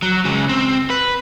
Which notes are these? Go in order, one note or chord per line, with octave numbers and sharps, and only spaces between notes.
F#3
C#3 G#3
C4
B4